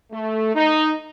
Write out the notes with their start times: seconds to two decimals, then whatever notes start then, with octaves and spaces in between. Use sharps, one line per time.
0.12 A3
0.55 D#4